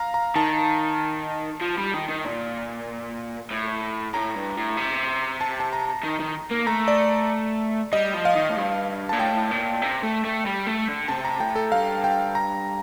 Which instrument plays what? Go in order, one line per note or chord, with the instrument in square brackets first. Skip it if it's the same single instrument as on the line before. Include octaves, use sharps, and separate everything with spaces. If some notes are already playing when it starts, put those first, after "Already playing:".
Already playing: [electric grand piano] F5 A#5
A#5
[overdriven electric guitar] D#3 [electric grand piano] A5
[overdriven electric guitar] F3
G3
D#3
D#3
A#2
A2
[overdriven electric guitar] A2 [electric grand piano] A#5
[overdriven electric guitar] G2
A2
C3
[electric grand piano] A5
A5
A#5
[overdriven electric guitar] D#3
D#3
A#3
[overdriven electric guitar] A3 [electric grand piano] A#5
[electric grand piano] D5
[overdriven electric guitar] G3 [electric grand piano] D#5
[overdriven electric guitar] F3
[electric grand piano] F5
[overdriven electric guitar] D#3
A2
G2
[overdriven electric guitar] A#2 [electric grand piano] A5
[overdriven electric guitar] A2 [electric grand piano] G5
[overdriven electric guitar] A#2
C3
A3
A3
G3
A3
D3
[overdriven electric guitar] C3 [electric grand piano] A5
[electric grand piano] A#5
[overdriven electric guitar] A2 [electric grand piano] G5
[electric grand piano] A4
[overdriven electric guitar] G2 [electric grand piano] F5
[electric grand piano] G5
A#5